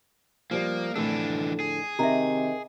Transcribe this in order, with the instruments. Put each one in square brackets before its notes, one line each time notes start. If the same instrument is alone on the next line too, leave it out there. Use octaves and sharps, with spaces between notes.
[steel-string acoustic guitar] F3 G3 [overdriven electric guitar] A#3
[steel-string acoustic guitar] F2 A2 D3 [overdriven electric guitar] E3 D4 [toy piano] A#4
[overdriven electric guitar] G#4
[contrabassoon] C3 [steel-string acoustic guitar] D#3 [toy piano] E5 A#5